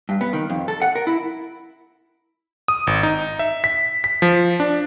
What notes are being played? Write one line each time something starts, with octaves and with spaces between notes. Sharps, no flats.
G2
B3
D#3
F2
A4
F#5
A#4
E4
D#6
G#1
D#4
E5
B6
B6
F3
D4